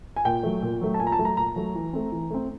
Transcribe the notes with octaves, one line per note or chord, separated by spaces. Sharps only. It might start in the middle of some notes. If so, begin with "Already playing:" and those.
G#5
A#2 G5
F#3 A3
A#2
F#3 A3
A5
A#2 G#5
A#5
A5
F#3 A3
A#5
A#2 A#5
F#3 A3
E3
A3 C4
E3
A3 C4